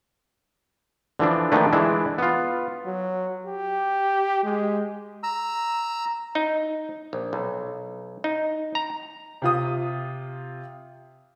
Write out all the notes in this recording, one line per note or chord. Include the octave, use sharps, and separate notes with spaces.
D3 E3 F3 D4
D#3 F3 A3 A#3 D4 B4
E3 G#3 D4 E4
B3 F4
F#3
G4
G#3
A#5 E6
D#4
A#1
B1
D#4
A#5
C3 F4 D#6